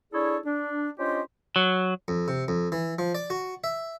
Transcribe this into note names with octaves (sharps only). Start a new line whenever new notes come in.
D4 E4 G#4 A4 C#5 D5
D4
C#4 D4 F4 G4 C5 D#5
F#3
F2
C3
F2
E3
F3
D5
F#4
E5